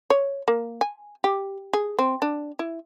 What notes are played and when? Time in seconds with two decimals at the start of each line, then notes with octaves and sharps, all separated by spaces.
0.10 C#5
0.48 A#3
0.81 G#5
1.24 G4
1.73 G#4
1.99 C4
2.22 D4
2.59 E4